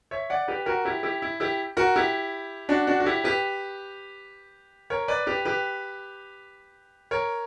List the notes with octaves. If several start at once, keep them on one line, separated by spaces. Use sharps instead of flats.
C#5 E5
D5 F#5
G4 B4
F#4 A#4
E4 G4
E4 G4
E4
E4 G4
F#4 A#4
E4 G4
D4 F#4
D4 F#4
F#4
E4 G4
G4 B4
A#4 C#5
B4 D5
G4 B4
G4 B4
A#4 C#5